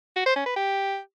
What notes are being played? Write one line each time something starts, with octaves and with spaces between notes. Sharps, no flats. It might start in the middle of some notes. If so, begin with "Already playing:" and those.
F#4
C5
C#4
B4
G4